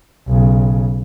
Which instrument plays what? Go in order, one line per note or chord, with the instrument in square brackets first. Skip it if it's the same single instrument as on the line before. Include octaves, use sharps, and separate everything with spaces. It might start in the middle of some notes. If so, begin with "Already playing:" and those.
[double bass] B1 C#3